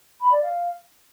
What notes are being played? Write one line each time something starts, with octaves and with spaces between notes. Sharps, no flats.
B5
D5
F5